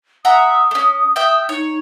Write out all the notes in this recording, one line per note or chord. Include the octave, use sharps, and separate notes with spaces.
E5 F#5 A#5 D#6
A3 C#4
E5 G5
D#4 C#5